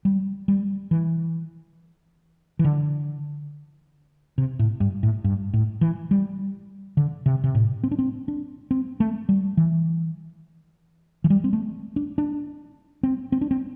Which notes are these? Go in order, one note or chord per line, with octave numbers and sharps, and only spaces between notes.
G3
G3
E3
E3
D3
C3
A2
G2
A2
G2
A2
E3
G3
D3
C3
C3
A2
C4
D4
C4
D4
C4
A3
G3
E3
E3
G3
C4
A3
D4
D4
C4
C4
D4
C4